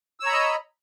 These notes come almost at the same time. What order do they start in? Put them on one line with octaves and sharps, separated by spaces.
E6 C#5 A#5 B5 D#5